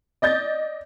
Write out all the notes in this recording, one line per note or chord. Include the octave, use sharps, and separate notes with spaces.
D5 D#5 G6 A6